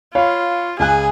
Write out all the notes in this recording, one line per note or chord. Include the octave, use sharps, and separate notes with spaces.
F4 C#5 F5 B5
C#2 G#4 G#5 F#6